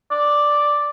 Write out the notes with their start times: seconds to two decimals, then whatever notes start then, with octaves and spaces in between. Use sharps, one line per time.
0.11 D5